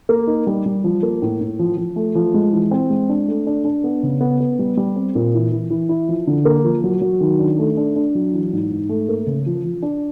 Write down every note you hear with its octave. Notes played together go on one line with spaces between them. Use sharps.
A#3
D#4
G3
G3
F3
A#3
A2
A2
F3
F3
A3
F3
G#3
E3
C4
G#3
D4
A3
D4
D4
B3
C#3
B3
B3
G3
G3
C4
A#2
E3
E3
E3
E4
F3
D3
A#3
F3
F#3
F#3
D#3
D4
A3
D4
D4
F#3
E3
G#2
G#2
A3
A#3
C#3
F3
F3
D4